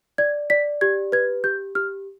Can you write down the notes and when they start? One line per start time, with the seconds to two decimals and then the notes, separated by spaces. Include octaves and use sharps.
0.18 D5 G#6
0.50 D5 B6
0.81 G4 G#6
1.12 B4 G#6
1.44 G4 G6
1.75 G4 F6